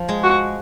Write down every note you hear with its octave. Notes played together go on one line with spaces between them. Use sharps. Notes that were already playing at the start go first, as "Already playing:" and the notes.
Already playing: F3
G#3
F#4